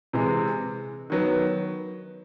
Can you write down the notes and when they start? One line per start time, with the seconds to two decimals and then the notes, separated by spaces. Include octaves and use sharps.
0.13 C3 E3 G#3
1.10 D#3 F#3 B3